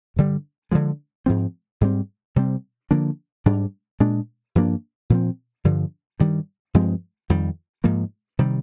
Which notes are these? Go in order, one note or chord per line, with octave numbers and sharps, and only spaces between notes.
G2 D3 G3
D3 F3 G#3
G#2 F3 C4
G#2 G3 C4
C3 G3 C4
D3 F3 A#3 D4
G#2 G3 D4
A#2 G#3 D4
G2 F3 A#3 D4
A#2 F3 C4
G2 D3 F3
G2 D#3 G3
G2 F3 G#3 C4
F2 D#3 G3
G#2 F3 A#3
C3 D#3 G3